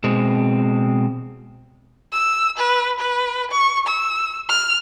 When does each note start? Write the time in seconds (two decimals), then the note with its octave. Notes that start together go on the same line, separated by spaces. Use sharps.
0.04 B2 G#3 C4
2.12 E6
2.58 B4
2.99 B4
3.51 C#6
3.87 E6
4.49 F6